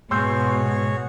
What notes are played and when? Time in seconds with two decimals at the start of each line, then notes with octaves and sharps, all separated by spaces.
0.11 G#2 B2 F#4 G#4 C#5 C6 E6 G6